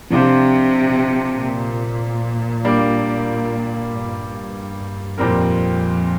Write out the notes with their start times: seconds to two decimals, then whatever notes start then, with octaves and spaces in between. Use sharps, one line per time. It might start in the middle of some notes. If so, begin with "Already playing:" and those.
0.10 C3 F3 D4 F4 C5
1.38 A#2
2.65 G3 A#3 D4
3.91 G2
5.18 F2 A#2 G3 C4 A#4